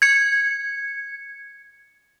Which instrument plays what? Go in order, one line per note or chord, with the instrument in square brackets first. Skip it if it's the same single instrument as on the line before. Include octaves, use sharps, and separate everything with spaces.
[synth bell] G#6 C#7